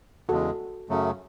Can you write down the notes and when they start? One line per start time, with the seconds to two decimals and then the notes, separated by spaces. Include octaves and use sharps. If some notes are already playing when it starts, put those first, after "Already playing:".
0.29 E2 C#3 G#3 F#4 A4
0.89 F#2 C#3 F#3 A3